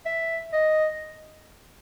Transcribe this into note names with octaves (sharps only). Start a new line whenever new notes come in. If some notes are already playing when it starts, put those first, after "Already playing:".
E5
D#5